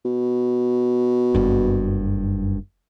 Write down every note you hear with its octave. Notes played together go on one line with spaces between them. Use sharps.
B2
F#1 G2